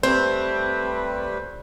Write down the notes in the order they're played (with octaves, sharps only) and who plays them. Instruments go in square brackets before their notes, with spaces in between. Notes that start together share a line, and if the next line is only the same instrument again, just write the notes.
[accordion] G3 A3 B4 [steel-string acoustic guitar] C4 [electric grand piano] C5